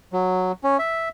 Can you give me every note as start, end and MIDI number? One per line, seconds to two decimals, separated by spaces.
0.13 0.52 54
0.64 0.77 61
0.79 1.09 76